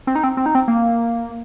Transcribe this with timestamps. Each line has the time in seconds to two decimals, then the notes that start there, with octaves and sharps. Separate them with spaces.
0.07 C4
0.15 D#4
0.24 C4
0.37 C4
0.46 D#4
0.55 C4
0.68 A#3